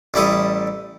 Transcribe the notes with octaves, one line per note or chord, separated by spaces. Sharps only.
A1 G3 E4 A4 D#6